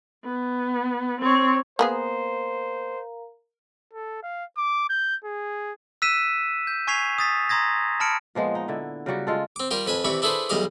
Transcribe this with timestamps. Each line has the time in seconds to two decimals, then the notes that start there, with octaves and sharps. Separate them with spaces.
0.24 B3
1.21 C4 C#5
1.79 A#3 B3 G#4 A#4 C5 F5 A#5
3.94 A4
4.23 F5
4.58 D6
4.90 G6
5.25 G#4
6.02 E6 F#6 B6 D#7 E7
6.67 G6
6.87 G#5 C#6 G#6 B6 C7 F7
7.18 D#6 A6 B6
7.49 A#5 C6 D#6 G#6 A#6
8.00 A5 B5 F6 C#7 D7
8.35 A#2 F3 G#3 B3
8.55 D#4
8.68 D3 E4
9.06 C#3 F#3 G3 F#4
9.27 G#3 F4 A4
9.56 C4 D6
9.71 G3 F4 G4 A#4 D5
9.87 F2 B4 G#5 A5
10.05 C3 E3 D5 B5 C#6
10.22 D4 E4 G#4 A4 B4 C5
10.49 B1 E2 G3 D#5 F5 D6